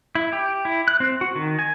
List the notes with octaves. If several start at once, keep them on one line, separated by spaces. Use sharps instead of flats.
E4
G4
E4
F#6
C4
F#4
D#3
G#5